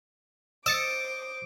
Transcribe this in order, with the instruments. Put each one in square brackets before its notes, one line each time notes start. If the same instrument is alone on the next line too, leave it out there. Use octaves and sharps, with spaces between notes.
[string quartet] C5 D6 [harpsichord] D#5 [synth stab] E6 A6 C#7